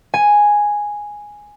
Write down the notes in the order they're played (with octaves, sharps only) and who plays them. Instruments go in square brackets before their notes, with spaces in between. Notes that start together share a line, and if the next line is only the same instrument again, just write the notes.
[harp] G#5